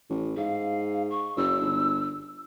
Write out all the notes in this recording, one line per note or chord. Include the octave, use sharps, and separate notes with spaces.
A1
G#2 F5
C#6
F#1 E6
G1